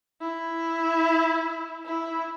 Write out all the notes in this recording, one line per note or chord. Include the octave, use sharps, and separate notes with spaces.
E4
E4